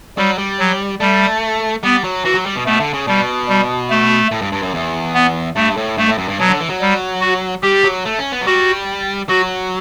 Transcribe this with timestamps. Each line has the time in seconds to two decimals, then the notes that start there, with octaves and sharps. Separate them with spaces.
0.18 F#3 G3
0.38 G3
0.59 F#3
1.00 G3 A3
1.83 G3 B3
2.04 F#3
2.24 E3 F#4
2.35 F#3
2.46 G3
2.56 B2
2.66 B2 A3
2.80 D3
2.93 C#3
3.07 B2 G3
3.48 G3
3.90 A3
4.31 A2
4.42 G2
4.52 G2
4.62 F#2
4.74 E2
5.14 B3
5.56 G2 A3
5.77 A2
5.97 G2 A3
6.09 A2
6.18 F#2
6.28 G2
6.39 B2 F#3
6.49 D3
6.60 E3
6.70 F#3
6.81 G3
7.21 F#4
7.63 G3 G4
7.84 F#3
8.05 A3
8.19 C#4
8.32 B3
8.42 F#3
8.47 G3 F#4
9.29 F#3 F#4